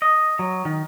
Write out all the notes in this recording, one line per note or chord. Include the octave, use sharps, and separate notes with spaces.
D#5
F#3
D#3